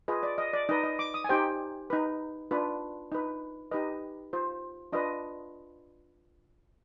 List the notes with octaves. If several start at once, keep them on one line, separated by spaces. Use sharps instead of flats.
F4 G#4 B4 D#5
D5
D#5
D5
D#4 B4 D#5
D#5
D6
D#6
G#5
D#4 G4 C5 G5
D#4 B4
D4 F4 B4
D#4 B4
D#4 G4 B4 D#5
F4 C5
D4 F4 B4 D#5